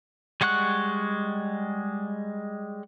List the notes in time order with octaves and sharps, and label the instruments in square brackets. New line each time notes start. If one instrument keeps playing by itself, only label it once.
[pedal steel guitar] G3 G#3 F#5 C#6 F#6